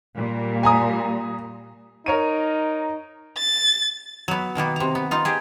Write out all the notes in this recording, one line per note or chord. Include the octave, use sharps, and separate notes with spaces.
A#2 G3
G#5 A#5 D#6
D#4 A#4 C#5 D#7
A6
F#3 B3
B2 D#3 A#3 B3
C3 A#5
B3
D#4 F4
G4 G#4